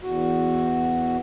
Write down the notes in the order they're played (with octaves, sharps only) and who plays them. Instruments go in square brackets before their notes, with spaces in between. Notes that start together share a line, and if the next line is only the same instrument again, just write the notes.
[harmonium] E2 F#4